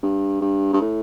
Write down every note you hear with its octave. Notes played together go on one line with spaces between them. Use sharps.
G2
G2
G2
A2